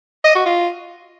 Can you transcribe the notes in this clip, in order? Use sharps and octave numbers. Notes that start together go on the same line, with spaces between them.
D#5
F#4
F4